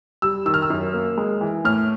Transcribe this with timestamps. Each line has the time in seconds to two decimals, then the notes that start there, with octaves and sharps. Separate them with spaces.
0.22 G3 E6
0.46 D#3 E6
0.54 F6
0.62 E6
0.70 F#2
0.94 A#3
1.18 G#3
1.41 E3
1.65 A2 F6